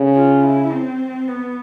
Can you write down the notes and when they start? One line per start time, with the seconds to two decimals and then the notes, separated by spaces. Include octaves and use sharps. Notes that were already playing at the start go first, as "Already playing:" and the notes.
Already playing: C#3
0.15 F4
0.43 E4
0.72 C4
1.27 B3